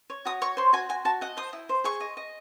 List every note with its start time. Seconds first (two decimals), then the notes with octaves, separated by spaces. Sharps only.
0.10 C#5
0.25 F#4 D#6
0.42 C#5 C#6
0.57 C5 C6
0.73 F#4 G#5
0.89 F#4 G#5
1.05 F#4 A5
1.21 D#5 F#5
1.37 C5 D#6
1.53 E4
1.69 C5
1.84 G#4 C#6
2.00 D#5
2.17 D#5